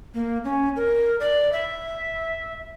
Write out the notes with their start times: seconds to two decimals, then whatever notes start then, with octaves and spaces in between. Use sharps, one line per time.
0.14 A#3
0.44 C#4
0.76 A#4
1.20 D5
1.52 E5